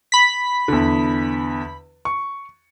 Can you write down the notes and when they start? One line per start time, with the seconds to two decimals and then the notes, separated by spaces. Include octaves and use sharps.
0.12 B5 B6
0.68 E2 D3
2.05 C#6